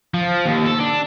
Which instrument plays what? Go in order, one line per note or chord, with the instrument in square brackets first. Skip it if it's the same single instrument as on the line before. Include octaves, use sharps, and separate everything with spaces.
[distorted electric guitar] F3
D#2
A4
D4